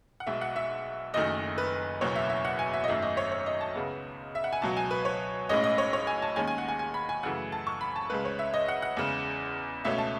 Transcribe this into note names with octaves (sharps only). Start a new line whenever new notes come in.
F#5
B1 B2 G#3 E5
F#5
E5
F#1 F#2 D#3 A3 D#5
B4
F#1 E2 B2 F#3 C#5
E5
E5
F#5
G#5
E5
D#5
G#1 F#2 D#3 A3 E5
D#5
C#5
C#5
D#5
A5
C#2 C#3 G#3 B3
E5
F#5
G#5
C#2 B2 F#3 A5
G#5
B4
C#5
B1 A2 G#3 C#4 D#5
D#5
C#5
C#5
G#5
A5
D#2 D#3 G#3 C#4 G#5
G#5
F#5
G#5
G#5
B5
G#5
F#2 C#3 E3 A3 F#5
A5
C#6
B5
A5
C#2 C#3 G#3 B4
C#5
E5
D#5
F#5
F#5
E2 C#3 G#3
C#2 B2 A3 C#4 E5
A5